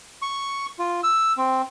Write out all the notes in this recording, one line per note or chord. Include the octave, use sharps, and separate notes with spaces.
C#6
F4
E6
C4